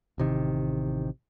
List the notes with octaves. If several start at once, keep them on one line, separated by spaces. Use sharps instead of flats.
A1 C3 D#3